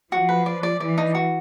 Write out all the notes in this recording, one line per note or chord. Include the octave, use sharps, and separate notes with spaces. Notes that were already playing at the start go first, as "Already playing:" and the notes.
F3 F#4
B4
D5
D5
E3 D5
D#4
F#4